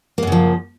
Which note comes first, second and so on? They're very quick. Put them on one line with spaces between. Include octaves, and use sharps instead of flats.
A#3 F#2 C#3 F3